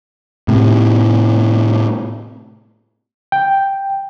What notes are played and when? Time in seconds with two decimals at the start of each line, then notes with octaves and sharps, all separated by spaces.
0.48 A2 C3
3.32 G5